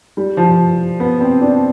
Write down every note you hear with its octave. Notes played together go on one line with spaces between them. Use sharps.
G3
F3
B3
C4
D4